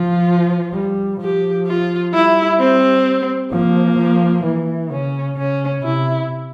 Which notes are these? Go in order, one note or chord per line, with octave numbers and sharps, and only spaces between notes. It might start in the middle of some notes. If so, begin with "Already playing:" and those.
Already playing: F3 F4
G3
F3 G4
F4
G3 E4
C4
F3 A#3
F3
E3
C#3 C#4
C#3 C#4
C3 E4